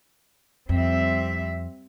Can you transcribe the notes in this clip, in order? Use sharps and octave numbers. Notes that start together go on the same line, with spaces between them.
F2 G3 C4 E5